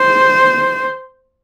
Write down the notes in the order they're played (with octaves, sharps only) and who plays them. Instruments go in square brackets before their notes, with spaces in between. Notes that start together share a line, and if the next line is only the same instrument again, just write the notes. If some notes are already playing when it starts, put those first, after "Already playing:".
Already playing: [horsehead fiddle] C5